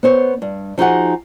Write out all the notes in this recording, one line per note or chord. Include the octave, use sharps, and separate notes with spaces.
B3 C5 C#5
G2
F3 D#4 F#4 G#4 F#5